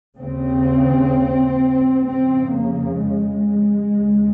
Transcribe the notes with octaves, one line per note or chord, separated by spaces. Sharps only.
D#2 C#3 C4
F2 C#3 C4
A#3
G#3
D#2 C#3